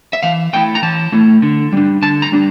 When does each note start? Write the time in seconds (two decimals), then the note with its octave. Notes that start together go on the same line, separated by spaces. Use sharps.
0.13 E5
0.23 E3 F5
0.53 A3 E4 G5
0.75 A#5
0.82 E3 A5
1.12 A3 E4
1.42 D3
1.73 G3 D4
2.02 D3 A5
2.22 A#5
2.32 G3 D4